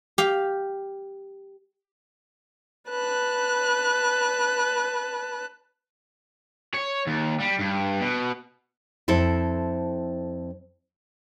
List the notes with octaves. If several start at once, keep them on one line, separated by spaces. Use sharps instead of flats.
G4 F5
B4 A5 F#6
C#5
D#2
G3
G2
B2
F2 C4 E4 A4